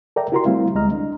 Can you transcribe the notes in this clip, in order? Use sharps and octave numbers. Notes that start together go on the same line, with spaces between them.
A4 A#4 D5 E5 G5 A#5
E4 F#4 G4 A#4 A#5 C6
G3 A3 C4 E4 F5
D2 G#3 D#5 A#5 F6
D4